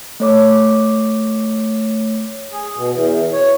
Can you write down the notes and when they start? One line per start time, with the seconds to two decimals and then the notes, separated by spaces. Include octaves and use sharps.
0.20 A3 C#5 D6
2.53 G#4
2.76 B2
2.92 E2
3.33 C#5